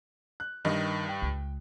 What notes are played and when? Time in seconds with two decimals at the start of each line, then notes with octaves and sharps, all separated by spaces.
0.40 F#6
0.65 G2 D#3 D#5
1.09 G5
1.22 C#2